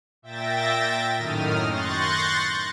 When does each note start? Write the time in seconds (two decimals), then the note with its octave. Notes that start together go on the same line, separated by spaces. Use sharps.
0.22 A#2 E5 G5 A6 A#6
1.16 F#2 A2 D#3 D#6 F6
1.69 C6 C#6 F#6 G6 A6 A#6